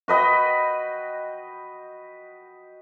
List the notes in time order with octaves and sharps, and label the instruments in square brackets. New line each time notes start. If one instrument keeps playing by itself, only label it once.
[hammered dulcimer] F#4 B4 D#5 G5